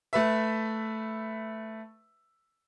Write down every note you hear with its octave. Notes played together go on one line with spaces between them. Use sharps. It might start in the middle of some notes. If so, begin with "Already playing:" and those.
A3 B4 E5